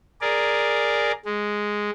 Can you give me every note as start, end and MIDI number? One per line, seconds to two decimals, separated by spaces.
0.21 1.12 68
0.21 1.12 70
0.21 1.12 74
1.25 1.90 56